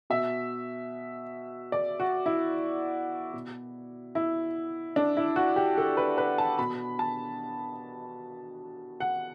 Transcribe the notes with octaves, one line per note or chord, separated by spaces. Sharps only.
B2 E5
D5
F#4
E4
B2
E4
D4
E4
F#4
G4
A4
B4
B4
A5
B2 B5
A5
F#5